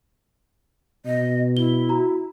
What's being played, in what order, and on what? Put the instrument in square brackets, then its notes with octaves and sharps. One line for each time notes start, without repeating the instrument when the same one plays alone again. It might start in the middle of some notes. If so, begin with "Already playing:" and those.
[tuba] B2 [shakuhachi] D#5
[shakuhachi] E4 [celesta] G7
[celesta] F#4 A#5